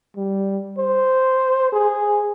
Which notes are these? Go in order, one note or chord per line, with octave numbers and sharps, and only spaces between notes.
G3
C5
G#4